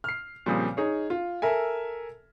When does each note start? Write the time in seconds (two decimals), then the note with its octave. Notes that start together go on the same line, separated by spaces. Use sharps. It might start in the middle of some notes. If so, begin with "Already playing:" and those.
0.04 F6 C7
0.46 A#2 C#3 F3 G3 C4 D#6
0.77 D#4 G#4 C#5
1.10 F4
1.42 A4 A#4 E5 G#5